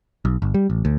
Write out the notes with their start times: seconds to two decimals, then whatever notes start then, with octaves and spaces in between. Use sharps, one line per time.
0.25 B1
0.42 G1
0.54 G3
0.70 A1
0.85 D2